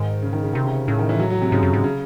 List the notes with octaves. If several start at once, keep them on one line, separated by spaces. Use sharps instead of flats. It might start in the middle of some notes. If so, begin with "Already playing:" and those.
Already playing: G#2 D#3
C#3
D#3
C#3
C3 D#3
C#3
A2 C#3
D#3
E3
F#3
F#3
C3
G#2 C#3
F#2
G#2
C#3